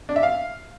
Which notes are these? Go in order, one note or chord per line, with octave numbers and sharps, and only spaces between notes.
D4
E5
F5